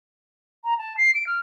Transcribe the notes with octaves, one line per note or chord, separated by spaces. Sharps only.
A#5
A5
C7
D7
F6